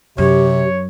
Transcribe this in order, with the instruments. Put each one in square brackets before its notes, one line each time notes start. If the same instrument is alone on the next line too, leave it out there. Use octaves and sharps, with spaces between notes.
[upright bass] F#2 [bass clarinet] C3 [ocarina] G4 [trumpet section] C#5